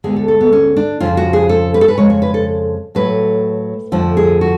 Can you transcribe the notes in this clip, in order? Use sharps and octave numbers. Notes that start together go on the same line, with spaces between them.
D2 D3 G#3 B3 G#4
A4
A4
B3
C#4
D4
F2 C#3 F3 F4
F#4
G#4
A4
B4
A4
B4
F2 C#3 G#3 C#5
C#5
B4
A4
A2 F#3 A3 B4
F2 D3 F3 A3
G#4
F#4